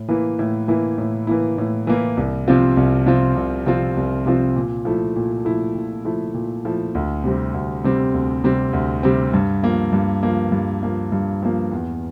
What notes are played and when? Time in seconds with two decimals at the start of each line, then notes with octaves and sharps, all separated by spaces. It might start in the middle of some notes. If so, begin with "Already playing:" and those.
Already playing: A2
0.09 E3 A#3 E4
0.39 A2
0.68 E3 A#3 E4
0.98 A2
1.27 E3 A#3 E4
1.58 A2
1.87 E3 A#3 E4
2.17 C2
2.48 C3 F3 C4 F4
2.77 C2
3.06 C3 F3 C4 F4
3.36 C2
3.66 C3 F3 C4 F4
3.97 C2
4.26 C3 F3 C4 F4
4.56 A#2
4.85 F3 A3 E4
5.16 A#2
5.45 F3 A3 E4
5.75 A#2
6.05 F3 A3 E4
6.34 A#2
6.65 F3 A3 E4
6.95 D2
7.24 C3 G3 C4
7.54 D2
7.84 C3 G3 C4
8.14 D2
8.44 C3 G3 C4
8.73 D2
9.03 C3 G3 C4
9.33 G2
9.63 F3 A#3
9.93 G2
10.23 F3 A#3
10.52 G2
10.83 F3 A#3
11.12 G2
11.43 F3 A#3
11.71 E2